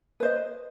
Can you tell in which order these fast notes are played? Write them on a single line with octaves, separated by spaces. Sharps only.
B4 C5 D#5